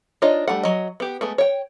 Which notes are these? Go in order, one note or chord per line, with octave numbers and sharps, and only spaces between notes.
D4 D#4 F4 C#5 D#5
G3 A3 D4 F#5
F#3 D#5
B3 G4
G#3 A3 B3
C#5 G5